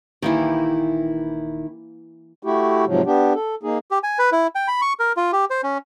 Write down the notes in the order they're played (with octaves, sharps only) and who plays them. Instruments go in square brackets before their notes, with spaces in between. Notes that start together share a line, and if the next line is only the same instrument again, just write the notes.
[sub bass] D#1 [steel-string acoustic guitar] D#3 E4 [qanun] E3 A#3 G4
[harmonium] A3 E4 F#4 G4
G#2 C3 F3 F#3
B3 D4 G4
A4
A#3 D#4 G#4
[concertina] G4
G#5
B4
E4
G5
B5
C#6
A#4
F4
G4
C5
C#4